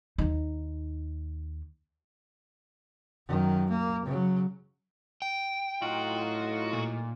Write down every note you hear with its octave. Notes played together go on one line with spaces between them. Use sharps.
D#2 D#4
F#2 D#3
A#3
C#3 F#3
G5
A2 F#3 D#4 F4 F#4
A#2